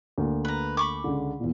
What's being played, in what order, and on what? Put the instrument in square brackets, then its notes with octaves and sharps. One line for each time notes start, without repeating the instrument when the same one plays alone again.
[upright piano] D2 A#3
[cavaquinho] B4 A#5
B5 C#6 D6
[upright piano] C#2 D3
E2 A#2